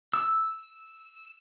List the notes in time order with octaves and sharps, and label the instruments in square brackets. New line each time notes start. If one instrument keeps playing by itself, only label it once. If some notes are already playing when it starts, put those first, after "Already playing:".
[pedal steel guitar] E6